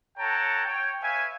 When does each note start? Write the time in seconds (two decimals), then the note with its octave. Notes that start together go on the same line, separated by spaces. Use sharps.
0.18 A4 C#5 F#5 G5 A5 A#5
0.66 C#5 G5
1.02 B4 C#5 E5 F5 G#5